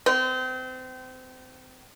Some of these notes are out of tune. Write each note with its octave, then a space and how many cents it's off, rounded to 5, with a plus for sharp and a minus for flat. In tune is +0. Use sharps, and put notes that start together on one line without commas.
C4 -30